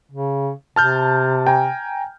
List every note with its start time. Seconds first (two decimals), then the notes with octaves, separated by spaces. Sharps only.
0.12 C#3
0.76 C3 A5 F6 G6
1.47 G5 G#5 A#5